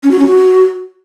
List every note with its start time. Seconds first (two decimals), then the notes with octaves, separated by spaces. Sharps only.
0.03 C#4
0.11 F#4
0.19 C#4
0.27 F#4